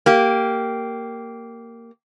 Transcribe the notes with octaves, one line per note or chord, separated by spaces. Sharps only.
A#3 G4